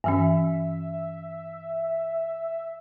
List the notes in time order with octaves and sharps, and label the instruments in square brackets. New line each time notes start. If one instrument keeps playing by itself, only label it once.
[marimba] G2 E3 C#4 [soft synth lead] E5